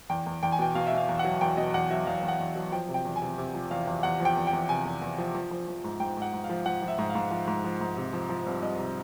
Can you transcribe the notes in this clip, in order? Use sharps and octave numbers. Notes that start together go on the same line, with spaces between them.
E2 G5
E2
E2 G5
G#5
B2 G5
B2 F5
E5
B2
F5
E2
F#5
F#3
E2 G5
B2 D#5
E2 F#5
F#3 E5
E2 F5
E2
F#5
E2
F#3
F3 G5
C3
G5
E2
G#5
C3
C3
F3
E2 F5
E2
E2 F#5
F3
G5
E2
G5
E2
C3 G#5
E2
E2
F3
F3
F3
F3
G#2
G#2 G5
G#2 F#5
G#2
F5
F3
F3 F#5
F3
E5
G#2
F5
G#2
F3
G#2
F3
G#2
C3
F3
F3
C2
C2 D#5
C3